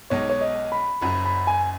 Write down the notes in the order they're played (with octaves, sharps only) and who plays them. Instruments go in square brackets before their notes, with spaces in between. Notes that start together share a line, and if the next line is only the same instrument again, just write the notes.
[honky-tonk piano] B1 B2 G#3 D#4 [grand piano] C#5
[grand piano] C#5
D#5
B5
[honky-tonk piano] F#1 F#2 F#3 [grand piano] B5
[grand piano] B5
G#5